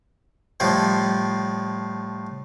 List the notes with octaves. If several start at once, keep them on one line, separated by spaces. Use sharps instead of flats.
A2 F3 G3